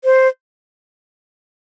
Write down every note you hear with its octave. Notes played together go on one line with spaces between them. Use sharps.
C5